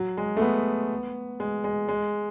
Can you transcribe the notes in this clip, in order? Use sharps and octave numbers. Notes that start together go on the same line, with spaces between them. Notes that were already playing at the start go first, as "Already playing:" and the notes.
Already playing: F#3
G#3
A3
B3
G#3
G#3
G#3